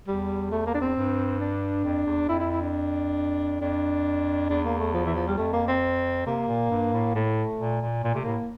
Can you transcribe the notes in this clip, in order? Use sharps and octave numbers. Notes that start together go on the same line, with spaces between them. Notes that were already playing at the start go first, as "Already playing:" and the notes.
E2 G3
A3
A#3
D4
C4
G2
D4
F2
E2
F2 E4
E4
E4
D4
F2 D4
E2 D4
A#3
A3
F3
E3
F3
G3
F2 A3
A#3
C4
C3 A#3
A#2
G2
A2
A2 A3
A#2
A#2
A#2 A#3
C3 A3
A2 A#3